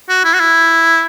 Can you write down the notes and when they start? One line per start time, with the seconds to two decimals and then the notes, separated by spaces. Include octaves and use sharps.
0.09 F#4
0.24 E4
0.34 F#4
0.40 E4